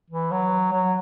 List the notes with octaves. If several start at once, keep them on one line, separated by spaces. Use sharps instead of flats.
E3
F#3
F#3